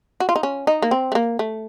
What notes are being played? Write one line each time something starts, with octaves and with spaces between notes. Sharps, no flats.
F#4
F4
D#4
C#4
D#4
A#3
C4
A3
A#3
A3